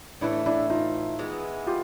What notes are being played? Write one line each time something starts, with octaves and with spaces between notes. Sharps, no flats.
A2 E3 A3 D4 E4
D4 E4
D#4 F4
E3 G#3 B3
F4 G4